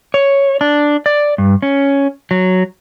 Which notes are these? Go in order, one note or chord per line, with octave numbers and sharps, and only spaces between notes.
C#5
D4
D5
G2
C#4
F#3